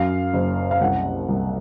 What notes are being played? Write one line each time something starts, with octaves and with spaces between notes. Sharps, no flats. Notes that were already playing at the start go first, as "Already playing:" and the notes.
Already playing: F#2 F5
F#1
F5
C2 F#5
C2